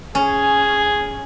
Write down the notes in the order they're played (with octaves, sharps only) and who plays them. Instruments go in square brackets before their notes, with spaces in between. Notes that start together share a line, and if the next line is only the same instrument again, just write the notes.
[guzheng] C#4 [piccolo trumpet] G#4